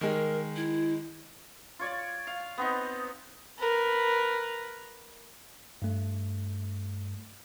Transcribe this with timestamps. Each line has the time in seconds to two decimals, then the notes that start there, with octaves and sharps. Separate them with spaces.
0.01 D#3 G#3 A#4
0.56 E4
1.79 F4 C#5 D5
2.27 F5
2.58 B3 C4 D#4
3.58 A#4 B4
5.82 G2 A3